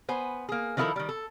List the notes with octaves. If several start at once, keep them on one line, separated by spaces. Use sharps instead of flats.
B3 C5 G#5
A#3 G#4
D#3 F3 E4 F4 A4 A#4
D#3 G3
A4